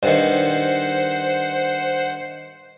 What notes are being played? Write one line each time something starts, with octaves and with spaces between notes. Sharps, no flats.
G2 D#3 C5 F#5 C7